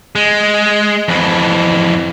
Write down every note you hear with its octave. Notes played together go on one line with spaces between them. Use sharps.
G#3
F2 E3